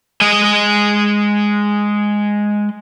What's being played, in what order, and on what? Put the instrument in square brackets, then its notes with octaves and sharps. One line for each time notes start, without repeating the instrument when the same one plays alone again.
[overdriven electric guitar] G#3 D#5